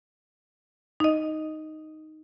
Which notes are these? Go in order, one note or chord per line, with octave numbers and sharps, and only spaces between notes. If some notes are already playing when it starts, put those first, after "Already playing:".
D#4 D#5